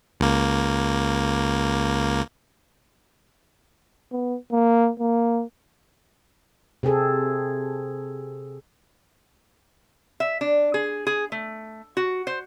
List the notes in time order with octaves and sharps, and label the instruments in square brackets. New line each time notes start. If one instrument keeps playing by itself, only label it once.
[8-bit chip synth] C#2 A#3
[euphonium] B3
A#3
A#3
[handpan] C3 C4 G#4 A4
[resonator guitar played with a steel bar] E5
D4
G#4
G#4
A3
F#4
C5